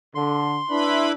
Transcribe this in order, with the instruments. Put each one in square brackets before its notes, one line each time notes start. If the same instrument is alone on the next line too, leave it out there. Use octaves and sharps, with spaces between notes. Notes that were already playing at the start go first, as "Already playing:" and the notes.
[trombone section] D3 [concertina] C6
[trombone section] D4 [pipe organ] E4 B4 B5